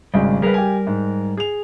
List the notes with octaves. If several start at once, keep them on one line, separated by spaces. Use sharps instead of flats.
G#1 C#3 G3 G#3
G3 G#4 A#4 B4
G4 G#5
G#2
G#4 F7